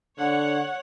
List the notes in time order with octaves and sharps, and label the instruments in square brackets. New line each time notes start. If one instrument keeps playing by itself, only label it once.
[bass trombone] D3 [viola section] C#5 F#5